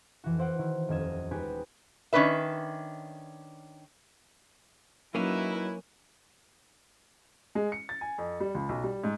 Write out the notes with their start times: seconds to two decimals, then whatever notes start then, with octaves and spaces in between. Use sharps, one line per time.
0.24 F2 E3 F#4
0.38 E4 C5 F#5 D7
0.59 D#3 E4
0.88 D#1 F2 D#5 G#6 E7
1.31 G#3 D#4 F#4 G4 B4 G#5
2.13 D#3 C#4 D4 B4 E5
5.15 F#3 A#3 C#4 D#4 E4 B4
7.55 G#3
7.72 C#7
7.89 A6
8.01 G#5
8.18 F2
8.40 G3
8.55 C#2
8.69 B1
8.84 G3
9.04 G#2